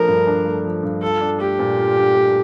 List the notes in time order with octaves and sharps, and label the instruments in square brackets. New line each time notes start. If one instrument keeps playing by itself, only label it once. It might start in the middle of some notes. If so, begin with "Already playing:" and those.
Already playing: [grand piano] F3 A3 D4 [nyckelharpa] A#4
[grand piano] G2
D4
A3
F3
G2
[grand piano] F4 [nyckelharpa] A4
[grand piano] D4
[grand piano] A3 [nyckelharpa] G4
[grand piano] A#2
F4
D4
A3